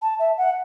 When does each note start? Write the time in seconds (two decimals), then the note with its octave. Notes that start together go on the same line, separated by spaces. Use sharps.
0.02 A5
0.19 E5
0.38 F#5